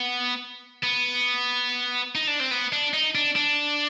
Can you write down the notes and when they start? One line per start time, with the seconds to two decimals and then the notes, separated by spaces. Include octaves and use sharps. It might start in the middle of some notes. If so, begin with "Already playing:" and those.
Already playing: B3
0.83 B3
2.15 D#4
2.27 D4
2.40 C4
2.51 B3
2.73 D4
2.94 D#4
3.15 D4
3.36 D4